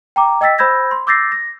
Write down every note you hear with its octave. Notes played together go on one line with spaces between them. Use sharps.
G5 A#5 D6
D#5 G5 E6 A6 B6
C5 B5 E6 G6 G#6 A#6
C6
D6 E6 G6 A6 A#6 C7
A#6